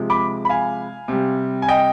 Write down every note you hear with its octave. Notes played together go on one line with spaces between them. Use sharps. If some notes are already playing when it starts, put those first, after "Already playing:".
Already playing: C3 F3 G#3
B5 D6
B5
F5 G#5
C3 G3
G#5
D#5 G5